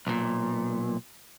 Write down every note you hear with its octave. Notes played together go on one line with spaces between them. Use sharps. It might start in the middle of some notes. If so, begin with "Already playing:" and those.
B1 A#2